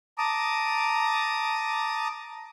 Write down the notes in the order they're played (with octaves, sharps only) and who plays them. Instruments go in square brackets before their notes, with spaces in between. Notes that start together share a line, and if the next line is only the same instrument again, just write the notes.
[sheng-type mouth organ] A5 A#5 D6 D#6